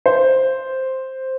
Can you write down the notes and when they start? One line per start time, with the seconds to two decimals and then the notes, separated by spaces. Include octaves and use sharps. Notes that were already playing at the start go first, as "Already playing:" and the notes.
0.06 C5